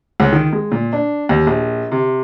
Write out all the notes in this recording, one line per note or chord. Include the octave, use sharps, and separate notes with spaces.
C#2
D#3
G#3
A#2
D4
D#2
A#1
C3